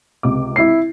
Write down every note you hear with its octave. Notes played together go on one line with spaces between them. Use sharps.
C#2 C3 D6
E4 C7